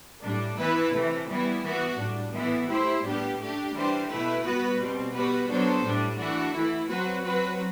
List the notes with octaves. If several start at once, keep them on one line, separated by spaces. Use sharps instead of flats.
A2 G3 D4
E3 B3 E4 B4
C3 E3 A3
E3 G3 B3 E4
E3 B3 F#4
A2 G3 D4
A2 E3 B3 E4
A3 E4 G4 C5
A2 G3 B3 D4 G4
A3 D4 G4
E3 G3 D4 G4 C5
B2 A3 E4 B4
G3 B3 F#4 B4
B2 G3 C4
G3 B3 F#4 B4
F#3 B3 D4 A4 C5
A2 G3 D4
E3 A3 D4 F#4
E3 A3 E4
F#3 C4 F#4 B4
F#3 C4 F#4 B4